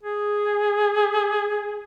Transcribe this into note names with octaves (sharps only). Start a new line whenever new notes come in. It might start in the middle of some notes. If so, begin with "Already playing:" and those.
G#4